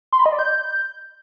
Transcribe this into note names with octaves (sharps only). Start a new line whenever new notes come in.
C6
B5
D#5
D5
G6